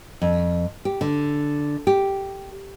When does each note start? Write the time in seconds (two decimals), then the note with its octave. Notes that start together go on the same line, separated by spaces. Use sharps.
0.22 F2
0.85 G4
1.01 D3
1.87 G4